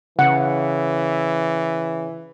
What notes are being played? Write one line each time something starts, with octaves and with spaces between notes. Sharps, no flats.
C#3 E3 F#5